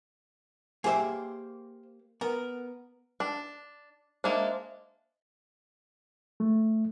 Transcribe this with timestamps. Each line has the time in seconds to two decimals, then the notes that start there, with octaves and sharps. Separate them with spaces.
0.84 A#3 G4 G#4 C5 E5
2.21 B3 A#4
3.20 D4
4.24 G#3 A#3 D4 C5 D#5 E5
6.40 A3